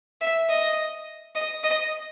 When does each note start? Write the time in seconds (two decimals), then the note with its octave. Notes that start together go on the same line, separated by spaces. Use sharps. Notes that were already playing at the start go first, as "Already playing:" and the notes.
0.21 E5
0.49 D#5
1.35 D#5
1.64 D#5